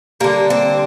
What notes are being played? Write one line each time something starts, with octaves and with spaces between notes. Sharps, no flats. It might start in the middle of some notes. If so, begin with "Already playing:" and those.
D3 G3 A#3
C4